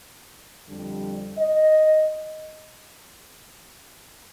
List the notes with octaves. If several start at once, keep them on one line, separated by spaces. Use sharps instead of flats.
F2 D3 G3
D#5